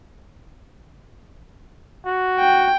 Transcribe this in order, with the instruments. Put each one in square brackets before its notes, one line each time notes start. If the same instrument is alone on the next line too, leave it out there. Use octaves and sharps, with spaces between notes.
[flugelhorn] F#4
[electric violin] G5